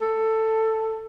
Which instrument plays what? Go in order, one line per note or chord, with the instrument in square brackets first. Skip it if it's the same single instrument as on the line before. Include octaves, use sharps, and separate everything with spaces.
[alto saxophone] A4